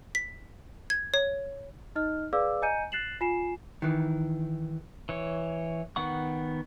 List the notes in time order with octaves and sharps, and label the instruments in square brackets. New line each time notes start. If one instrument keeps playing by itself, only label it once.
[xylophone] B6
G#6
C#5
[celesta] D#4 D#5 F6
G#4 B4 D5 F5 D6 E6
D#5 G#5 A#5 G6 C#7 D#7
F#6 A6 C7 E7 F#7
F4 G#5 C7 E7
[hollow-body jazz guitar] D#3 E3
[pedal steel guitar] E3 C#5
D#3 B3 F#5 C#6